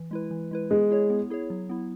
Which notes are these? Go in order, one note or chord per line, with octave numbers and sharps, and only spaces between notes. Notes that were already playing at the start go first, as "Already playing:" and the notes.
Already playing: E3
G#3 E4 B4
E3
G#3 E4 B4
G#3 B3
E4 G#4 C#5
B3
E4 G#4 C#5
F#3
B3 E4